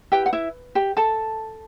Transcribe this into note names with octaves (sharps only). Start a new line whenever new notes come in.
E4 G4 B4 G5
F#5
E4 E5
G4 G5
A4 A5